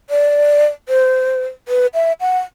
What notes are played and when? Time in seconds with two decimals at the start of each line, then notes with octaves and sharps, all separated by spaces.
0.10 D5
0.89 C5
1.68 B4
1.94 E5
2.20 F#5